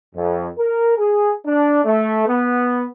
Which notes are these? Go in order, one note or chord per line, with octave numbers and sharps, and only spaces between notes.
F2
A#4
G#4
D4
A3
B3